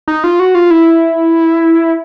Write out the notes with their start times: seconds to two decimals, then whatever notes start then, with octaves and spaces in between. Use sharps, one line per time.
0.08 D#4
0.24 F4
0.39 F#4
0.55 F4
0.71 E4